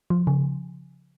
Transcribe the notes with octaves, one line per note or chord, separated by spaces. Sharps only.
F3
C#3